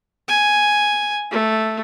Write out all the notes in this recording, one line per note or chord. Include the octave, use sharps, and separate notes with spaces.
G#5
A3